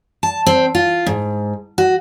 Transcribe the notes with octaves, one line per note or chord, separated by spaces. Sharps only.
A5
C4
F4
G#2
F#4